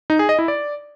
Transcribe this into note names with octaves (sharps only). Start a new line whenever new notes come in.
D#4
G#4
D#5
E4
D5